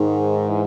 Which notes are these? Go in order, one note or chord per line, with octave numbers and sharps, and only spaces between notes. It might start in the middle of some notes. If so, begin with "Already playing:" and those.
Already playing: G#2 D#3
E3